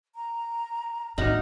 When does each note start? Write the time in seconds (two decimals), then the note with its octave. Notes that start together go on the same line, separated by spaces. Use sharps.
0.15 A#5
1.18 A2 D4 D#4 F#4 E5 F#5 F6